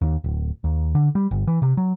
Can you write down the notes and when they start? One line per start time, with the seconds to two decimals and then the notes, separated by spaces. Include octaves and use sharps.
0.02 D#2
0.24 D1
0.64 D#2
0.95 D3
1.15 G3
1.31 G1
1.47 E3
1.62 C3
1.77 F#3